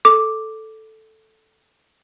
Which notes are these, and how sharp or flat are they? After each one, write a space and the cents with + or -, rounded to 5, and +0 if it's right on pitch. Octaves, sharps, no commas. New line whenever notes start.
A4 +0 D6 +0